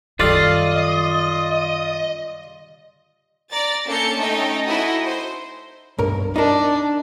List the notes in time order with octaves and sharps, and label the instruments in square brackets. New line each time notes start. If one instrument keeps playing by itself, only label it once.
[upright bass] F#2 D#3 [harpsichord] G3 A4 [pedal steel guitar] F4 D5 F5 [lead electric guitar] D#5
[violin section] D5 A#5 A6
A#3 C#4 D4 A4 G6 C#7
A3 C#4 D#4 A4 D#5 G5
D#4 E4 F#4 A4 D#5 G#5
C5
[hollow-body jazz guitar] B1 G2 A#4
[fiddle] D4 [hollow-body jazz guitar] D#4 A#4